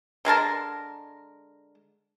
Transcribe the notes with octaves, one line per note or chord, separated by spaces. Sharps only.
D3 G#3 A#4 A5